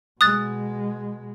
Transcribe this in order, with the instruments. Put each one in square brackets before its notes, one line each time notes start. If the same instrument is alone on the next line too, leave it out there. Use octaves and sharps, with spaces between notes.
[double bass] B2 G#3 [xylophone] D#6 F#6 A6